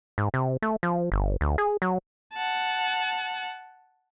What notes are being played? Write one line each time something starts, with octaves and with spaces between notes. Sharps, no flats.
G#2
C3
A3
F3
G1
D2
G#4
F#3
F#5 A5